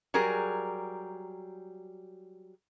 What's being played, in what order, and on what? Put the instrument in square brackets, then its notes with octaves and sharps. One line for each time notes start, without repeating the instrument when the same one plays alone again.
[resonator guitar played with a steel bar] F#3 G3 G#4 A#4